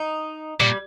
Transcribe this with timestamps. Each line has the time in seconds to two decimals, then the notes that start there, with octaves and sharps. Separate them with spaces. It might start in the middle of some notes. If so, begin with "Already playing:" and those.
Already playing: D#4
0.60 A#2 G3